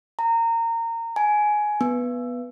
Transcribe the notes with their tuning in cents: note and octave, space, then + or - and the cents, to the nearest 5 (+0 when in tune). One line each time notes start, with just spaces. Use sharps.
A#5 -25
G#5 +15
B3 -5